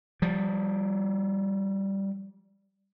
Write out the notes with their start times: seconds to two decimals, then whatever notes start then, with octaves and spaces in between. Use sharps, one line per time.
0.22 F3 G3